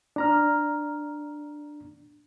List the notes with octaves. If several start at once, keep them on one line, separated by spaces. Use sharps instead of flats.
D4 A#5 F6